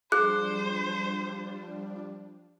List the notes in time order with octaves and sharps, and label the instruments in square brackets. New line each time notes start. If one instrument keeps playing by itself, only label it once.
[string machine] F3 G3 D4 [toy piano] G#4 [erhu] C5 [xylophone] F#6